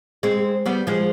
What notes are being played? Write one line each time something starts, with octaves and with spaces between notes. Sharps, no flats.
G#3 C4
G3 B3
F3 G#3